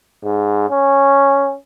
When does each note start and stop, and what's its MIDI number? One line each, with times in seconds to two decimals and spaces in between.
0.24 0.69 44
0.70 1.54 61